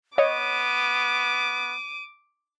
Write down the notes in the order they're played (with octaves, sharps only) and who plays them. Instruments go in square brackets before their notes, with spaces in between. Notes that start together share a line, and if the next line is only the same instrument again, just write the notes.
[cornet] B3 [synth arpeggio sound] C#5 D#5 [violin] D6 [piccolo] D#7